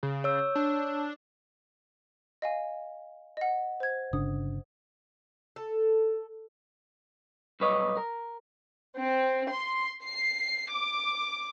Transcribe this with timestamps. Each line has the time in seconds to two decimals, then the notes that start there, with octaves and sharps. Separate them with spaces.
0.03 C#3
0.24 C#5 E6
0.55 D4
2.42 D#5 F5 G#5
3.37 D#5 F#5
3.80 C5 G#6
4.13 G1 C#3 D4 D#6
5.56 A4
7.60 B1 G2 B4 C#5 D#5
7.97 A#4
8.96 C4
9.50 C6
10.04 C7
10.72 D6